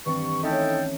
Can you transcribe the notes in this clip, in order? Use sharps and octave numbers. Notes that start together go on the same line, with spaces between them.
G2 D#3 E3 C4 C#6
A3 C#4 D#4 E4 A4 G5